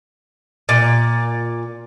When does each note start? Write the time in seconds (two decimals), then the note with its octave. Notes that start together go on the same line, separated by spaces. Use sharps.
0.69 A#2